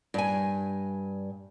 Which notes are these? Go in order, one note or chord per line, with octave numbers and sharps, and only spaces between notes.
G2 G#5